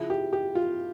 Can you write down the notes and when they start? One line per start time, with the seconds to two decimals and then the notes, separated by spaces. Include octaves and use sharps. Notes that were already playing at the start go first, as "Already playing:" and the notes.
Already playing: C#3 F3 E4
0.10 G4
0.33 G4
0.55 F4